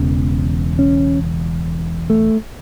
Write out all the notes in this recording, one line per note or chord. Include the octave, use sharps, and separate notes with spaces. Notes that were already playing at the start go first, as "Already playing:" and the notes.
Already playing: E1 E2 C#3
C#4
A3